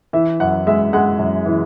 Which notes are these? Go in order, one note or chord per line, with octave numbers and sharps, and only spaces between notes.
E3 E5
F#2 F#5
G#3 E5
G#3 F#5
F#2
E3